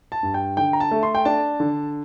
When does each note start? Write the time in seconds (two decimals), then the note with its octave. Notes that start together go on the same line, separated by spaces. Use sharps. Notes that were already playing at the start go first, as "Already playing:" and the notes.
0.12 A5
0.23 G2
0.34 G5
0.57 D3 G5
0.73 A#5
0.80 A5
0.91 A3
1.03 C6
1.15 G5
1.25 D4 A5
1.60 D3